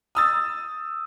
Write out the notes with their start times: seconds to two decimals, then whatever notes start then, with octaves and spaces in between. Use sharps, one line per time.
0.15 D#6 E6 A6